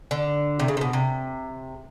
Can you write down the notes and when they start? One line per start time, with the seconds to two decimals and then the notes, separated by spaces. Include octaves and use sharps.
0.11 D3
0.59 C3
0.68 C#3
0.77 C3
0.81 B2
0.93 C3